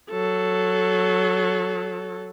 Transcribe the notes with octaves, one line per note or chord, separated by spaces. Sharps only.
F#3 A4